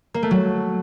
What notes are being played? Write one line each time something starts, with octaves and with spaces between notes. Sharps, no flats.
A#3
A3
F#3